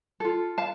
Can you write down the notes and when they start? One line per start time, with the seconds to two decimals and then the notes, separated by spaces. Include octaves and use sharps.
0.20 F4 A4
0.58 F5 A5